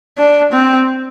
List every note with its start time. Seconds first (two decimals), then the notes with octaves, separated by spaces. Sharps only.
0.18 D4
0.52 C4